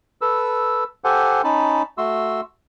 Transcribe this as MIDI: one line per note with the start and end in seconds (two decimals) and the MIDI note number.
0.21 0.84 69
0.21 0.84 71
0.21 0.84 88
1.04 1.42 67
1.04 1.42 69
1.04 1.42 72
1.04 1.42 78
1.04 1.42 80
1.44 1.82 61
1.44 1.82 63
1.44 1.82 81
1.44 1.82 83
1.98 2.41 57
1.98 2.41 66
1.98 2.41 84
1.98 2.41 88